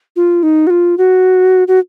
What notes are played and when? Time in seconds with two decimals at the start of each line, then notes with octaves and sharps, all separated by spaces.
0.16 F4
0.43 D#4
0.67 F#4
0.70 F4
0.98 F#4
1.68 F#4